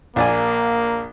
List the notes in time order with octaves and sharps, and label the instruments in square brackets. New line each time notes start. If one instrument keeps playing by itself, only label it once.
[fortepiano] A#1 D5 G#5 [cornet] A#3